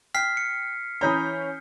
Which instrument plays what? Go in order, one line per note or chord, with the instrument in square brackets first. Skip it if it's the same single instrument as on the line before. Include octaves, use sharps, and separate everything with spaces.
[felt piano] G5 [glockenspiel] F6 B6 C7
[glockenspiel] C#7
[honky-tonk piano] E3 C#4 G6 [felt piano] A#5 B5 D#6